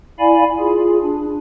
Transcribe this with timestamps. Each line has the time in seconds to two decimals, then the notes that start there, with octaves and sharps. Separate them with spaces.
0.19 E4 D5 F5 G#5 B5
0.59 F4 G#4
1.03 D4